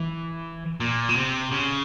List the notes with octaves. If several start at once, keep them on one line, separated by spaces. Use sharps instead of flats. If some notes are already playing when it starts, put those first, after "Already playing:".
Already playing: E3
A#2
C#3
C3
C#3